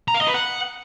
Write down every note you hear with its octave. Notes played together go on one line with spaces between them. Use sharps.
A#5
F5
D#5
B4
F#5